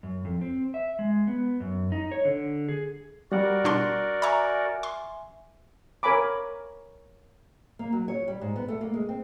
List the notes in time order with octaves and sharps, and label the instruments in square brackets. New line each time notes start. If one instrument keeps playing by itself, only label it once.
[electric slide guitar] F#2
F2
C4
E5
G#3
B3
F#2
D#4
C#5
D3
G#4
[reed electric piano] G3 F#5 [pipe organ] F#4 A#4 D5
[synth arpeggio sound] B2 D4 C6
[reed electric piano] E5 G#5 [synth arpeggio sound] A#5 C#6
[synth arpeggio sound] C6
[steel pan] A#4 C#5 G#5 B5 D6
[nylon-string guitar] A#3
F#3
C#5
G3
G#2
B3
A3
A#3
G#3
C4